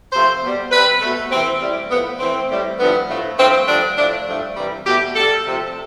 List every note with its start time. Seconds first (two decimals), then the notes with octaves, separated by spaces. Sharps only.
0.12 C3 F3 A3 C5
0.42 B2 G3
0.71 C3 G3 B4
1.01 B2 A3
1.30 C3 E3 A3 C4
1.60 A2 G3
1.90 A2 F3 A3 B3
2.19 A2 E3 A3 C4
2.49 A2 G3
2.78 G2 D3 F3 A3 B3
3.09 A2 F3 A3
3.38 G2 F3 A3 C4
3.67 G2 D3 F3 A3 D4
3.97 A2 F3 A3 D4
4.26 G2 F3 A3
4.56 C3 E3 G3
4.86 B2 A3 G4
5.15 G2 D3 G3 A4
5.45 C3 F3 A3